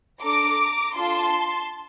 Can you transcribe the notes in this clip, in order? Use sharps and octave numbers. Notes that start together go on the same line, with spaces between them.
D4 A4 A#5 D6
D4 F4 A4 A5 C6